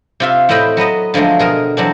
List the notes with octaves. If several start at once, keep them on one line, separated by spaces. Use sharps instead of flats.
C3 F4 E5
A2 C4 E4 D#5 G5 B5
F#3 B3 B4 D#5
D3 F3 F#3 G#3 A3
B2 G#4 A#4
E3 F#3 C4 D4